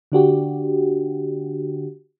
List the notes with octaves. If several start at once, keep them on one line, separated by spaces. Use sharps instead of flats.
D3 D4 F#4 G4